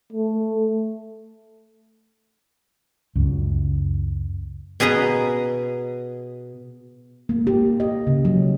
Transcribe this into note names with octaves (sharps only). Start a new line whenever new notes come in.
A3
C#2 F#2
B2 G#4 B4 D#5 A#5
A#3
G4
D#5
C#3
F#3